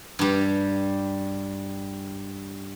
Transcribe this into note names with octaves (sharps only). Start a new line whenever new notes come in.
G2 G3